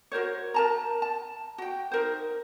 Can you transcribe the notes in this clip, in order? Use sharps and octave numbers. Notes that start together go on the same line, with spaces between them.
F#4 A#4 C5 C#5
A#4 A5 A#5
A5
F#4 G5
D#4 A#4 C5